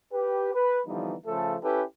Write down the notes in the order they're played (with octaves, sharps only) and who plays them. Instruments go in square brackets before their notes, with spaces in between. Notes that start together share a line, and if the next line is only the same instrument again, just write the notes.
[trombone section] G4 B4
B4
D3 E3 F3 G3 B3 D#4
C#3 F3 A3 A4
C#4 E4 G4 A4 B4